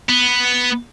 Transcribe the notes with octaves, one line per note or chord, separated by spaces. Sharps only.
B3